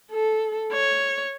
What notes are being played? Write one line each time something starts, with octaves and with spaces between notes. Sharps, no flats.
A4
C#5